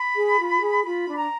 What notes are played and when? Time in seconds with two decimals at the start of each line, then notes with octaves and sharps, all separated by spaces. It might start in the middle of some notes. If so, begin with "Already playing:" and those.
Already playing: B5
0.15 G#4
0.40 F4
0.62 G#4
0.85 F4 B5
1.08 D4
1.16 A#5